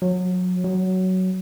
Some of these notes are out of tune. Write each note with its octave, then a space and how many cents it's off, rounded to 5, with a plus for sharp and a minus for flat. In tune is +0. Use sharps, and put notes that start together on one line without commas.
F#3 -25
F#3 +10